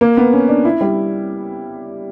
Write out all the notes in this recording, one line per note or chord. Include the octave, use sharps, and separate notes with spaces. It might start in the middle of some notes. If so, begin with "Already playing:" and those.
A#3
B3
C#4
D4
E4
G3